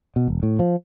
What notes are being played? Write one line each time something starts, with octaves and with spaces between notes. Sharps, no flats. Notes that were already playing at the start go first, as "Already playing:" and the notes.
B2
E1
A2
F3